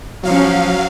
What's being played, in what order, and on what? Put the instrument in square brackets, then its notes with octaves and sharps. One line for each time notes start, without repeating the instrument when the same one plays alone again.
[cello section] F3 C#4 [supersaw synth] F#3 F5